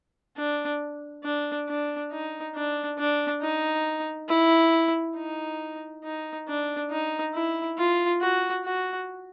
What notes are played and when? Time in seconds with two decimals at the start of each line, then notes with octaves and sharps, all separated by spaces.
0.37 D4
1.24 D4
1.68 D4
2.12 D#4
2.55 D4
2.99 D4
3.42 D#4
4.29 E4
5.17 D#4
6.04 D#4
6.48 D4
6.90 D#4
7.34 E4
7.78 F4
8.21 F#4
8.65 F#4